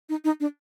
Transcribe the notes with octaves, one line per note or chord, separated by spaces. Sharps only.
D#4
D#4
D4